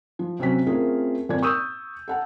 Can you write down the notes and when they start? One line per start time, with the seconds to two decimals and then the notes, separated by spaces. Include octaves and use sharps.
0.19 F3
0.39 C3 F#3 C4 C#4 B6
0.67 A3 C4 C#4 F4 G#4 A#4
1.29 G#1 A#2 A#3 D5 G#6
1.43 C#6 D#6 E6 G6 D#7
2.08 A4 F#5 A5